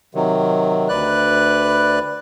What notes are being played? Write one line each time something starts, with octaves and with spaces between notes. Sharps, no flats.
C3 D#3 F#3
D2 B4 D5 F#6